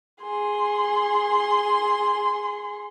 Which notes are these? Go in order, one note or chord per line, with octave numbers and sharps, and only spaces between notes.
G#4 C6